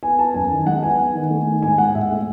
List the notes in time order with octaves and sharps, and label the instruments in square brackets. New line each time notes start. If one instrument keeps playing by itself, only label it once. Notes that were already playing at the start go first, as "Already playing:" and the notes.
[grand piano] B3 G#5
B3 A5
F#2 G#5
D#3
G#3 F#5
B3 G#5
B3
D#3
A3
D#3
G#2 G#5
G#2 F#5
G#2 E5
A3